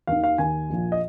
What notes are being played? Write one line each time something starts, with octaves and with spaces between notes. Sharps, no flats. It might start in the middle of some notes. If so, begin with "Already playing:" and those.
D#2 D#3 F5
F5
D#2 D#3 G#5
A#1 A#2 F3
D#5